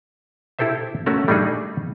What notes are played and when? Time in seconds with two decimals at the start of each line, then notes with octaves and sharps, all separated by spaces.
0.59 E4 G4 A4 C5 E5
1.06 A3 C#4 F#4 A#4
1.28 G3 A3 D4 D#4 G#4